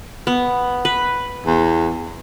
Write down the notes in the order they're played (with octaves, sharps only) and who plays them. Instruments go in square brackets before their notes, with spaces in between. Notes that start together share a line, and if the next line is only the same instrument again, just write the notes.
[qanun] B3
B4
[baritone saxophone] E2